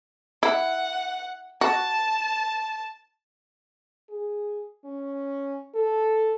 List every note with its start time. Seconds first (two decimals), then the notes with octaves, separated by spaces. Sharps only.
0.43 E4 F#5
1.61 F#4 A5
4.10 G#4
4.85 C#4
5.75 A4